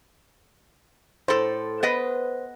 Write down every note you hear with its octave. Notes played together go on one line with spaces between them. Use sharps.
A2 A4 C5
B3 B4 D#5